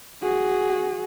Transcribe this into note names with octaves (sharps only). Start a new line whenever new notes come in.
F#4 G#4